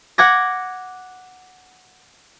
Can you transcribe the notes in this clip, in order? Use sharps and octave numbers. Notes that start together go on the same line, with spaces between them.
F#5 D6 F#6 G#6 A#6